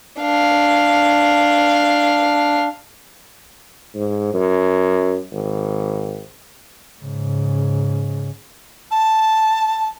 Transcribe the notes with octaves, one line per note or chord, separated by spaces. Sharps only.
D4 F5
G#2
F#2
G#1
G#2 C#3
A5